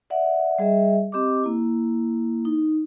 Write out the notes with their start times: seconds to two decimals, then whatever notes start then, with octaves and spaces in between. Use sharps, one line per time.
0.10 D5 E5 F#5
0.58 G3 G#4 D#5 E5
1.12 C4 G4 D#5 D6
1.44 A#3 E4
2.45 D#4